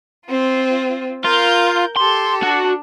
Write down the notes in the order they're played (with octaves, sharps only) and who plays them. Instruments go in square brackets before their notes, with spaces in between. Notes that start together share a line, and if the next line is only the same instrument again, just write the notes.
[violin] C4 F4
[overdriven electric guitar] F4 [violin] A#4 G6
[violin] G4 A4 [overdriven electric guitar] C6
[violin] D4 [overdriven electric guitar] F#4